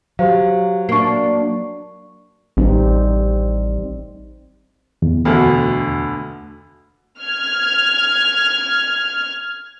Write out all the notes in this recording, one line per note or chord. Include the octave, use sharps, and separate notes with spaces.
F#3 G4 C5 F5
A#3 D4 C#6 C7
A1 G3 C4 D#4
E2
D2 B2 D3
F6 G#6